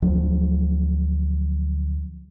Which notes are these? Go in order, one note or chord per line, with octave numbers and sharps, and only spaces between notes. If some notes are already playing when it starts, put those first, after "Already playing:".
D2 F3 F#3